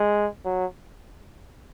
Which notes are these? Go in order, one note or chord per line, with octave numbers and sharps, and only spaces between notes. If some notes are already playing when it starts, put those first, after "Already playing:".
Already playing: G#3
F#3